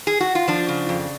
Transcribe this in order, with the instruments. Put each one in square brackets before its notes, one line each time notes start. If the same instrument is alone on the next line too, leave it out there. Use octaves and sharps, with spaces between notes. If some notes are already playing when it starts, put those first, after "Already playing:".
[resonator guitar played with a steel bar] G#4
F#4
F4
F3 D4
C#3
F2